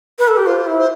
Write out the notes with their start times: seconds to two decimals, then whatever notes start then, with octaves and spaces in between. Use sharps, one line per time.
0.19 B4
0.28 A4
0.37 G4
0.46 F4 C5
0.67 E4
0.78 C5